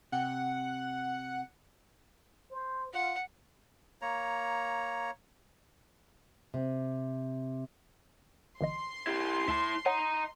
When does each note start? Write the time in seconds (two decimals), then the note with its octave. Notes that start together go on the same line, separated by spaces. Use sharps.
0.12 C3 F#5 G5
2.51 C5
2.93 F4 F#5
4.02 A#3 C#5 A#5
6.54 C3
8.61 G1 E3 D#5 C6
9.07 E4 G4
9.48 D2 E4 A5
9.86 C#5 D#5 F#5 A#5